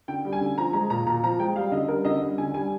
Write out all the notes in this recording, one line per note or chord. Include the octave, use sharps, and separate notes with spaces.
D3 G5
G3
G#5
D3
F3 A#5
G#3 A#5
A#2 A#5
A#2 A#5
F3 A#5
G#3 G5
G3 F5
D3 D#5
G3 A#4
D3 D#5
G3
D3 G#5
G3 G#5